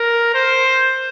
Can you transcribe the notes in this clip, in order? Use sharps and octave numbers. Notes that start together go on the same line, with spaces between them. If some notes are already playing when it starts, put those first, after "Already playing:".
Already playing: A#4
C5